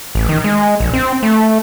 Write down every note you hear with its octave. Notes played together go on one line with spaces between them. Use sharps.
A1
D#3
G#3
A#1
C4
A3